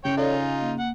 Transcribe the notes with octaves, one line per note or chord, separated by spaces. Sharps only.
C#3 C#5 G5
D#4 F4 A4 C#5 D5
D#5 G#5
A#3
F#5